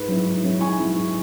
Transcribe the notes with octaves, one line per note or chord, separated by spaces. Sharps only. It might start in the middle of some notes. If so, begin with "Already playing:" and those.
Already playing: G#2 B4
F#3 C#4 E4
G#2
F#3 C#4 E4
G#2 G#5 C#6
F#3 C#4 E4
G#2